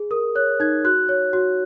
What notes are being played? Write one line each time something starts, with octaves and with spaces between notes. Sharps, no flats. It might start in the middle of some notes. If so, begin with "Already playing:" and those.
Already playing: G#4
A#4 D#6
C#5 F#6
D#4 G#6
F#4 F#6
C#5
F#4